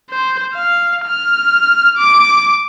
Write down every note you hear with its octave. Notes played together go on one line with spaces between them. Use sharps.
C5
F5
F6
D6